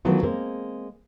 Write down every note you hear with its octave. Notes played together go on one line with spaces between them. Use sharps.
D#3 E3 F#3 A3 B3 F4
G#3 A#3 C4 A#4